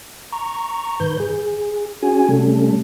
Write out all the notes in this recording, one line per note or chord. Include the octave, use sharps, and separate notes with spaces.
A#5 C#6
G2 D#3 B4 G6
G#4
C#4 F#4 G#4 G#5
C3 G3 A3 C#4 A4